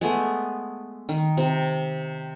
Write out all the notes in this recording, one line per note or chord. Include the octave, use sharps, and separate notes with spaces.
G#3 A3 B3
D#3
C3